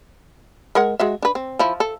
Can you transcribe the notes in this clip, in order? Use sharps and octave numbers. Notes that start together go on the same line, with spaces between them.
G#3 A#4 F#5
G#3 F#4 E5
D4 B4
C4
F3 E4
A4